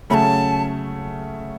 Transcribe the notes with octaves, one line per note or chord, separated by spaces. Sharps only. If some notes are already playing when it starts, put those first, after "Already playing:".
C#3 F#3 A3 C#4 A5 B5